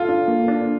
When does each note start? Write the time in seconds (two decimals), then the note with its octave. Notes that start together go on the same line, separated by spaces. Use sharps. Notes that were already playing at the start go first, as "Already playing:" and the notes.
Already playing: F4 A4
0.09 D4
0.28 A#3
0.48 D4